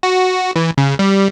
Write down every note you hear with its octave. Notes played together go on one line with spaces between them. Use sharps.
F#4
E3
C#3
G3